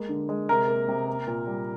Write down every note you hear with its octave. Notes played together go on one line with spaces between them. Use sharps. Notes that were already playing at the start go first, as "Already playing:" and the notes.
Already playing: G#3 A#3
D3
G#3
C3 A#4
A#3
C3
A#3
A#2
G3